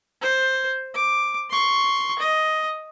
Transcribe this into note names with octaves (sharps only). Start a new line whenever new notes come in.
C5
D6
C6 C#6
D#5